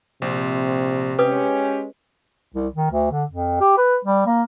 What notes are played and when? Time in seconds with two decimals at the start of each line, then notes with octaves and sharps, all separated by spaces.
0.22 A#1 C3 C4
1.19 G#3 C#4 G4 B4 D#6
2.54 C2
2.75 D#3
2.91 D2
3.12 D3
3.31 F2
3.60 G4
3.78 B4
4.05 G3
4.26 A#3